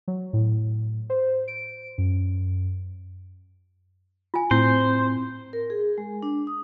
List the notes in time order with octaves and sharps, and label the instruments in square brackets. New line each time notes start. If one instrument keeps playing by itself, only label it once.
[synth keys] F#3
A2
C5
D7
F#2
[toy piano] F4 G#5
[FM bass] A2 [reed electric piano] C4 [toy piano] E4 [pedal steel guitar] C5
[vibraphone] A#4
G#4
G#3
D4
D#6